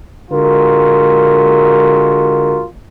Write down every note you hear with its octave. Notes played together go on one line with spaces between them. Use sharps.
D3 G#3 F4 F#4 A#4